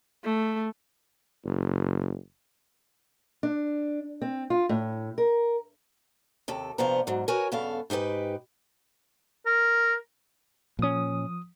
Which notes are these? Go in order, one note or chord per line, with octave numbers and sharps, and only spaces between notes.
A3
F#1
D4
C4
F4
A2
A#4
D#2 C3 A4
G2 C3 F3 B3 C5 A#5
G#2 F#3
F#4 A#4 B4 C#5 G#5
G2 C#3 B3 A4 F5
G#2 D#4 G4 A#4 B4
A#4
A#2 F3 C#4 D#6